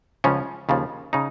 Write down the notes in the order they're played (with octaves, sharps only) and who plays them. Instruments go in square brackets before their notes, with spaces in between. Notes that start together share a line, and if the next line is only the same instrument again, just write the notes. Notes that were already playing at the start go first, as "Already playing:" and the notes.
[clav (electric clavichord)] C#2 C#3 F3 C#4
D#2 C#3 F3
C#3 D#4